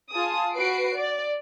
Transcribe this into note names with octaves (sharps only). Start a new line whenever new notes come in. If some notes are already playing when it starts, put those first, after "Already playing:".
F4 G#4 A5 D#6
F#4 B4 C7 D7
D5